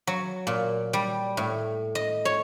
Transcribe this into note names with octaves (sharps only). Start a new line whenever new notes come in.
F#3
A#2
G3
A2
D#5
C#5